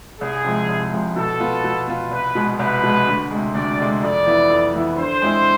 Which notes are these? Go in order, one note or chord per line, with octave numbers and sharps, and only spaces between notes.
C2 G#4
C3 F3 G#3
C2
C3 F3 G#3
B2 A4
B3 F4
B2
B3 F4
C2 B4
B2 G#3
C2 B4
B2 G#3
D2
C3 G#3
D2 D5
C3 G#3
F2 D5
E3 B3 E4
F2
E3 B3 E4
D3 C5
G#3 C4 E4 G#4